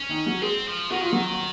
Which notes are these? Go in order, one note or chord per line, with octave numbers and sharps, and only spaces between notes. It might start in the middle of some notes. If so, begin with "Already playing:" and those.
Already playing: C#4
D#3 D#4
F#3 F#4
G#3 C4 G#4
F3
D#3 F#4
F4
F#3 F#4